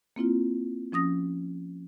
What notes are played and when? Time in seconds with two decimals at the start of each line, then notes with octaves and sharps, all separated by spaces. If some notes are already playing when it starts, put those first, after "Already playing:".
0.16 A#3 C4 E4 F4
0.92 F3 C#4 D#6 A#6